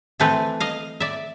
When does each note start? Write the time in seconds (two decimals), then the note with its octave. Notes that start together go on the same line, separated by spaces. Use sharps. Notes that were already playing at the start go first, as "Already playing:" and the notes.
0.20 E3 A3 C4 A4 B4
0.60 D#5 F5
1.00 D5 E5